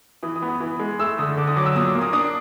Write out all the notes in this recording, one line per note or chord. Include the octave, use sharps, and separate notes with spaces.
E3 D#6
D#6
B3
D#6
E3
G#3
A3 E6
D3 D#6
D3 D6
D#6
F#3 D6
E6
A#2 D#6
D6
A#3
D#6
D4 D#6